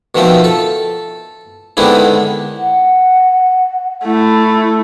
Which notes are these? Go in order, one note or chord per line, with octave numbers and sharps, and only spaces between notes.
B2 D#3 F3 C4 E5
A4
D3 D#3 G#3 B3 C4 E4
F#5
A3 E4